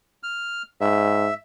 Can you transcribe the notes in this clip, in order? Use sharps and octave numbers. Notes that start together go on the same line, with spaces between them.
F6
G#2 E5